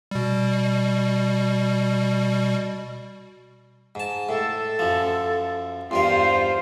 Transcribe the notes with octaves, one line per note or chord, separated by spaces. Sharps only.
B2 G3
G#2 A5
A2 A4
F#2 F3
E2 G2 F4 A#4 C5 C6